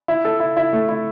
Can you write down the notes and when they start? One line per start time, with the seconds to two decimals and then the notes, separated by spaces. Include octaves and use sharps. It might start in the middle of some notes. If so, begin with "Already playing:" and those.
0.08 E4
0.25 A4
0.40 E4
0.57 E4
0.73 A3
0.89 E4